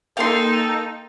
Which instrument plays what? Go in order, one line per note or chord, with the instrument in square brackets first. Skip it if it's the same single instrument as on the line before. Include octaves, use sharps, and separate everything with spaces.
[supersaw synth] A#3 G5 [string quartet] D#4 [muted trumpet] A4 [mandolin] F5 C6